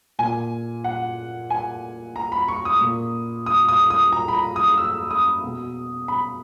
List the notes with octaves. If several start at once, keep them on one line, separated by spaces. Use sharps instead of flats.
A#2 G#5
F#5
G#5
A#5
B5
C#6
D#6
A#2
D#6
D#6
D#6
A#5
B5
A#5
D#6
E6
D#6
B2
B5